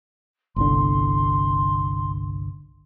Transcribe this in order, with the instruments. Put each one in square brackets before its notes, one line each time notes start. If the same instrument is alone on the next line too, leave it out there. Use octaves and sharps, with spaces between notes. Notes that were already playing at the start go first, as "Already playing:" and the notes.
[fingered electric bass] G1 C2 D3 [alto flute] C6